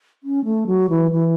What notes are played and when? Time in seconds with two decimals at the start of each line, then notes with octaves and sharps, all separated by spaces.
0.23 C#4
0.45 A3
0.67 F#3
0.90 E3
1.12 E3